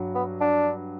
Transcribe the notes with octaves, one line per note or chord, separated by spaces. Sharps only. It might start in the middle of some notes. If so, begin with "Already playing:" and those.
Already playing: G2 F#3
B3
D4